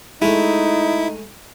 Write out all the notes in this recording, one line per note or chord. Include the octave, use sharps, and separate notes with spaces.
G#3 A3 D#4 E4